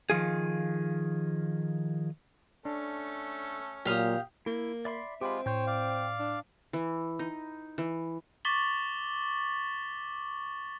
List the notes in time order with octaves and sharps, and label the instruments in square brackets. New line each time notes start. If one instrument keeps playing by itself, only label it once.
[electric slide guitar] D#3 F3 F4 G#4
[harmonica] A3 C#4 A4 [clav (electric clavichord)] D4
[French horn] A#2 [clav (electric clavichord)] F#3 [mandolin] G4 F5 D#6
[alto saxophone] A#3 [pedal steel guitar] E4
[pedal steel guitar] D5 B5 C6 [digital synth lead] E5
[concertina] G#3 F4 [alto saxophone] C4 [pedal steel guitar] G4 B5
[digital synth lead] A2 [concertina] C5 C#5 [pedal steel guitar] G5 G6
[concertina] D5 F5
[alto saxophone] D4
[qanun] E3
D#4
E3
[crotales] C#6 D6 A6 B6 F#7 G7